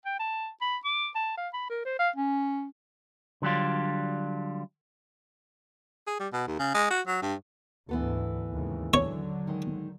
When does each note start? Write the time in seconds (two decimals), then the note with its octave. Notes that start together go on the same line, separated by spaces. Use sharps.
0.06 G5
0.20 A5
0.62 B5
0.85 D6
1.15 A5
1.37 F5
1.54 B5
1.70 A#4
1.85 C5
1.99 F5
2.16 C#4
3.42 D3 F#3 G3 D4 F4
6.07 G#4
6.19 G3
6.32 B2
6.47 D#2
6.59 C#3
6.74 G#3
6.90 F#4
7.07 F#3
7.22 G2
7.89 D2 G#2 E3 B3 A4
8.51 D#2 G#2 C#3
8.94 D3 F#3 C#5
9.47 D#3 G#3